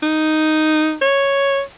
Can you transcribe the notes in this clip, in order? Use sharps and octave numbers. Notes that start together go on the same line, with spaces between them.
D#4
C#5